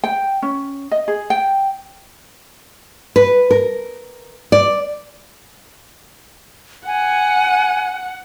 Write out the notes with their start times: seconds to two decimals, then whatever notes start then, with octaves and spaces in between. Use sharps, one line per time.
0.04 G5
0.42 C#4
0.91 D#5
1.08 G#4
1.30 G5
3.16 B4
3.51 A#4
4.52 D5
6.87 F#5 G#5